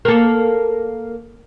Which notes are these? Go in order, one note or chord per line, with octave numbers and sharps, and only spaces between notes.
A#3 A4